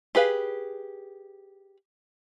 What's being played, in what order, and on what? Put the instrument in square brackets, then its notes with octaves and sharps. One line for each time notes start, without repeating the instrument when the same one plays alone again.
[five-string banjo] G4 G#4 B4 F5